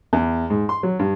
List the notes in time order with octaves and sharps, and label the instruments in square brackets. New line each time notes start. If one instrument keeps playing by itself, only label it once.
[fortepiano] E2
G#2
C6
F#3
G2